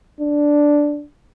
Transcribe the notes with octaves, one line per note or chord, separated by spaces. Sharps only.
D4